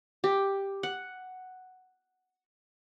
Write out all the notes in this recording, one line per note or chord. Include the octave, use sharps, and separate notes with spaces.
G4
F#5